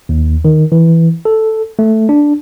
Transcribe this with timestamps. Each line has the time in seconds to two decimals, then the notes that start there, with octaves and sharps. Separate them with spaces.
0.09 D#2
0.45 D#3
0.72 E3
1.25 A4
1.79 A3
2.09 D4